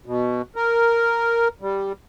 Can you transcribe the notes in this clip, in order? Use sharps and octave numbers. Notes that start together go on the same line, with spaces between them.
B2
A#4
G3